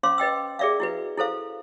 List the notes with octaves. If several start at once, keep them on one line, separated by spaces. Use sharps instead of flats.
C#4 C5 F5 C6 D6
B4 D#5 G5 E6
G#4 A#4 D5 E5 F5
E4 F#4 B4
E4 A4 C5 F5